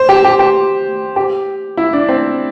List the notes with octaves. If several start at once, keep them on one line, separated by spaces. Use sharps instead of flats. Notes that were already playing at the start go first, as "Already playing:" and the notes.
Already playing: C5
G4
G4
G4
G4
E4
D4
C4